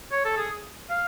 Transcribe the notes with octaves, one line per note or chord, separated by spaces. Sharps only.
C#5
A4
G#4
F5